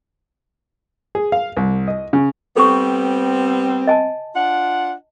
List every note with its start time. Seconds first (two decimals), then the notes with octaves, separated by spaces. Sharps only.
1.15 G#4
1.32 F5
1.57 C2
1.88 D#5
2.13 C#3
2.57 G3 B3 C4 A4 C#6
3.87 D#5 G#5 A5
4.35 D4 F4 F#5